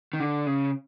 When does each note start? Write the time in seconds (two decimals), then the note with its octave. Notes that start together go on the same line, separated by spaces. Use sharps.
0.13 D#3
0.20 D3
0.47 C#3